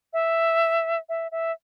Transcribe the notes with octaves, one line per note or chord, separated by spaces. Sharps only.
E5
E5
E5